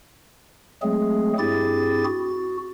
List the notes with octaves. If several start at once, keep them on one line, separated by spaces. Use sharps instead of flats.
F#3 G#3 A3 C4 G#4
G2 C4 E4 G4 G#4 A6
F#4